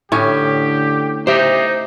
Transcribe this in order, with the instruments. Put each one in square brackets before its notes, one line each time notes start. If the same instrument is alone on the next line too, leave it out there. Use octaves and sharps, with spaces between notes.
[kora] A2 C#4 [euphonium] D3 [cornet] G4
[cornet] D#4 [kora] G4 [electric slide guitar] C5 E5